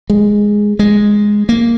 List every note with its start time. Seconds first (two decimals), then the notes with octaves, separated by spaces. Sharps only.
0.10 G#3
0.79 G#3
1.49 A#3